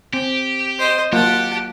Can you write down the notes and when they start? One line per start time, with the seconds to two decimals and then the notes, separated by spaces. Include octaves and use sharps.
0.14 C4 G4
0.79 C5 D#5
1.13 F#3 A#3 F4 G4 F#5 A5